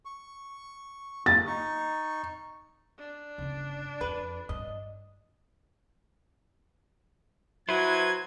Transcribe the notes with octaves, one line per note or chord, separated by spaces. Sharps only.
C#6
A6
D#4 C#6
D4
G1 C#3
F2 B4
G2 D#5
F#3 E4 B4 C5 G#6